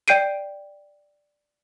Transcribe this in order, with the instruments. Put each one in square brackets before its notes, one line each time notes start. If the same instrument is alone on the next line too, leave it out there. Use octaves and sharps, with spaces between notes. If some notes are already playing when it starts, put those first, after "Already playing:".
[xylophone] D5 G5 G6 C7 D7 D#7